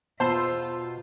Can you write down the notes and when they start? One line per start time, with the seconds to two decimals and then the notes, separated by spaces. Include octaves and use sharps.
0.20 E2 B2 F4 C5 A5 B5 C6 E6